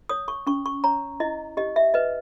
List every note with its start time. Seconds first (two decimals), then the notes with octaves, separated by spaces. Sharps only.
0.09 C#5 D#6
0.28 C#6
0.47 C#4 C#6
0.66 C#6
0.84 C#5 A#5
1.20 E4 D#5
1.57 G4 D#5
1.76 E5
1.94 B4 D#5